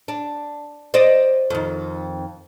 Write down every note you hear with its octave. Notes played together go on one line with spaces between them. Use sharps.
D4
C5 D5 D#5
F2 D#3